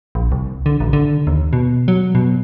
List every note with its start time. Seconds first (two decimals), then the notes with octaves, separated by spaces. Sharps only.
0.15 A#1
0.32 C2
0.66 D3
0.80 A1
0.93 D3
1.27 D#2
1.53 B2
1.88 F#3
2.15 B2